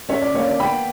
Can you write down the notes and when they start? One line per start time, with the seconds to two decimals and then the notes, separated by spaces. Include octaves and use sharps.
0.09 C#4 C#5 E5
0.22 D5
0.34 A#3 C#5
0.47 D5
0.60 B3 G5 B5